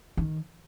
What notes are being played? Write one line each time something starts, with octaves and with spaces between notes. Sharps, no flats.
D#3